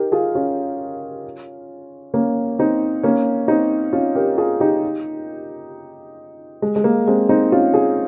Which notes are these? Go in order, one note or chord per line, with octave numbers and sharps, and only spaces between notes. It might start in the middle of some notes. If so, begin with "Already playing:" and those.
Already playing: D#4 G4 A#4
F4 G#4
C#4 F4
A#3 C#4
C4 D#4
A#3 C#4
C4 D#4
C#4 F4
G4 A#4
F4 G#4
D#4 G4
G#3
G#3
A#3
G#3 C4
C4 D#4
C#4 F4
F4 G#4